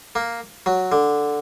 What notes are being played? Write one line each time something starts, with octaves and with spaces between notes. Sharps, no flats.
A#3
F#3
D3